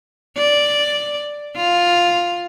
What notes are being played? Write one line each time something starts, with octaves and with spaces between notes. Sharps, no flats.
D5
F4